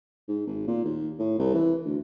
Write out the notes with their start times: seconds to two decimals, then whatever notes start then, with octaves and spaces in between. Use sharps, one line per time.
0.28 G#2
0.47 G#1
0.67 A#2
0.84 D#2
1.19 A2
1.39 C2
1.54 E3
1.85 D2